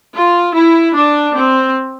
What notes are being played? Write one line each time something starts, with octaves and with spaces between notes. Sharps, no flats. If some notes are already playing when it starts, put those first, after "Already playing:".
F4
E4
D4
C4